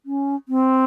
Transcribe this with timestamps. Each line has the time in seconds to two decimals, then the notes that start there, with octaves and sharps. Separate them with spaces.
0.06 C#4
0.49 C4